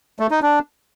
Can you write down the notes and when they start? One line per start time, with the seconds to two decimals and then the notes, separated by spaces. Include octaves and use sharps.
0.19 A3
0.31 D#4
0.42 D4